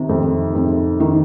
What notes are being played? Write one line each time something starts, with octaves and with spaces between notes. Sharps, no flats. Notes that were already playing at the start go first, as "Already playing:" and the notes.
Already playing: C3 D#3
F2
F2
D#3